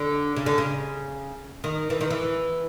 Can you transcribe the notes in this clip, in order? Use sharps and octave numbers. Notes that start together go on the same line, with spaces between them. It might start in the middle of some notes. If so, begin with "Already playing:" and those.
Already playing: D3
C#3
D3
C#3
D#3
E3
D#3
E3